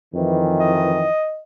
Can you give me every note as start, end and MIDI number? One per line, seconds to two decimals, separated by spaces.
0.14 1.06 41
0.14 1.06 51
0.14 1.06 52
0.59 1.40 75